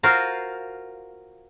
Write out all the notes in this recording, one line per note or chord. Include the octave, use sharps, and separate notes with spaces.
F4 F#4 A#4 C5 F5